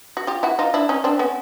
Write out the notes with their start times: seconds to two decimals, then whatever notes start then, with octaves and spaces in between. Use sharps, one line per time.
0.17 F#4
0.27 F4 G4
0.43 E4 F#4
0.59 D#4 F4
0.74 D4 E4
0.89 C#4 D#4
1.04 C4 D4
1.19 B3 C#4